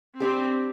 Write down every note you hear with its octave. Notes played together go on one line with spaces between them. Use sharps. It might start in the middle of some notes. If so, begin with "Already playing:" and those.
G3 C4 D4 G4